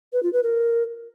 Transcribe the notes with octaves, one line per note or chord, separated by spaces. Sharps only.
B4
F4
B4
A#4